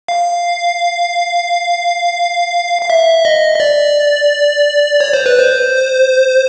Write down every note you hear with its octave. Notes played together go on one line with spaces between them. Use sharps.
F5
F5
E5
D#5
D#5
D5
C#5
C5
B4
C5